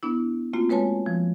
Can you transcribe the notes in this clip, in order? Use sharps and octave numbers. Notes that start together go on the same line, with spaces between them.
B3 D4 E4
A3 A#3 C4 F4 F#4
G#3 B4 C#5 G#5 A5
F3